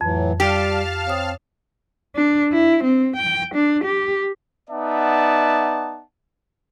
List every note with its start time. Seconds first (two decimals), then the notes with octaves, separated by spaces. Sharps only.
0.01 F2 A2 E3 F#3
0.40 G3 G4 F5 A5 F6
1.07 C4 C#5 D#6
2.15 D4
2.52 E4
2.84 C4
3.16 G5
3.55 D4
3.84 G4
4.70 B3 D#4 D5 E5 F#5 A5